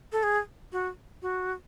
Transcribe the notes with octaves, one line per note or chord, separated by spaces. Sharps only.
A4
G#4
F#4
F#4